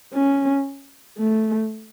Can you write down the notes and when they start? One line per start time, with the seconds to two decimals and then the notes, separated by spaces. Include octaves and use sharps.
0.13 C#4
1.18 A3